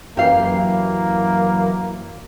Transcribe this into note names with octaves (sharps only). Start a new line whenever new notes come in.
F#2 E3 A#3 G4 F5